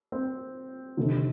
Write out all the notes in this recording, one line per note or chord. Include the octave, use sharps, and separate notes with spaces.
C4
F1 D#2 D3